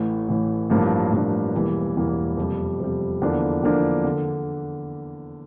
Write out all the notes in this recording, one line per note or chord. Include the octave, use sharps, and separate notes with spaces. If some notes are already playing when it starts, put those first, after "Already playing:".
Already playing: A1 A2 E3
A1 A2 E3
A1 G2 F3 A#3 D4
A1 G2 F3 A#3 D4
E1 E2 E3 G3 A#3
E1 E2 E3 G3 A#3
F2 C3 G3
F2 C3 G3
E2 D3 F3 A#3 D4
E2 D3 F3 A#3 D4
D3